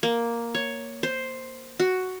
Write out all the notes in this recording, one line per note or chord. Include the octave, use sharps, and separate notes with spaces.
A#3
C#5
C5
F#4